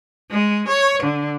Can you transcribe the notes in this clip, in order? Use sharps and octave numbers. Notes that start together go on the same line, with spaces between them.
G#3
C#5
D3